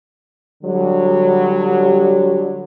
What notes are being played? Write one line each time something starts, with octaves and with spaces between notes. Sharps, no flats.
D3 F#3 G3